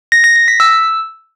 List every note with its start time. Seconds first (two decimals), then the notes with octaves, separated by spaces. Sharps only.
0.12 A#6
0.24 A#6
0.36 A#6
0.48 B6
0.60 E6